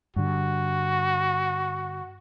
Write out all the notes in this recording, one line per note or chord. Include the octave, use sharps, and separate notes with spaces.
G2 D3 F#4